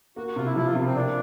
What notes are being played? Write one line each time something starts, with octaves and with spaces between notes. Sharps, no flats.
A#3 F#4
F#4
C3 F4
E4
F3 E4
F4
C3
C4
A#3 D4